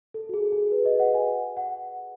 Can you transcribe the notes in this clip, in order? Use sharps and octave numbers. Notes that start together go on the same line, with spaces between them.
A4
F#4
G#4
G#4
B4
D#5
F#5
G#5
F#5